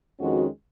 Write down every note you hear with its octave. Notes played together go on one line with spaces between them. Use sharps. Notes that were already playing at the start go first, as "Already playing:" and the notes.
F2 D#3 G#3 C#4 F#4